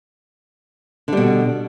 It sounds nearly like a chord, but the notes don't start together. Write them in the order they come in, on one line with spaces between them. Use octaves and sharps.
D3 G3 B2